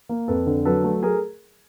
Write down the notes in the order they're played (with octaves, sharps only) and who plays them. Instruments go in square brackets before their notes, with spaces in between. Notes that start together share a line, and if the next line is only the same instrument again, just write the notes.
[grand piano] A#3
F2 A4 B4
D3
F#3 A4 B4
A3
A3 G#4 A#4